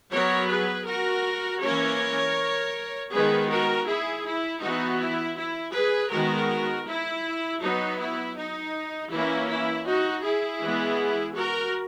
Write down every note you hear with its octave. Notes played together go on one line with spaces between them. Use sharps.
F#3 B3 A#4 C#5
G#4 B4
F#4 A#4
E3 A#3 C#4 A#4 C#5
D#3 G#3 B3 G#4 B4
F#4 A#4
E4 G#4
E4
E3 B3 D#4 F#4
E4
E4
G#4 B4
D#3 G#3 B3 F#4 A#4
E4
F#3 B3 D#4
E4
D#4
E3 A#3 C#4 E4
E4
D#4 F#4
E4 G#4
E3 G#3 B3
F#4 A#4